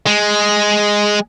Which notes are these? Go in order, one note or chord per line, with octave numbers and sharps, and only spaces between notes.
G#3